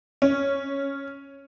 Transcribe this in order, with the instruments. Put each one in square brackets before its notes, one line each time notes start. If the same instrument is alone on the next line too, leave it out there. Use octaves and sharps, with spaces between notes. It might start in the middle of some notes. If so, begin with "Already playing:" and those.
[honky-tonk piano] C#4